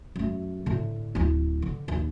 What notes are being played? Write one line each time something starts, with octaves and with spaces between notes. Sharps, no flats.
F#2 A3
A2 D3
D1 E4
D3
A#1 D#2